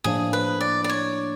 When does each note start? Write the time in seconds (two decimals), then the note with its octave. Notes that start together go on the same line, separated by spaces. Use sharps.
0.04 A2 F3 A#3 D4 G#4
0.33 B4
0.61 D5
0.84 D5
0.89 C#5